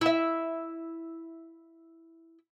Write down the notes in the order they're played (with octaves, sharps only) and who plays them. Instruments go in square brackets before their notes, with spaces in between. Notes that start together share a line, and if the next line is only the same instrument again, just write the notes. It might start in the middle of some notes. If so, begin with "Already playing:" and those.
[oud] E4 E5